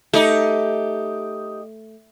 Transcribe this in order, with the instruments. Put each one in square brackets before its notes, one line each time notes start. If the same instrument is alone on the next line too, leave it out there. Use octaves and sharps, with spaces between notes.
[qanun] A3 [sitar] D#4 G4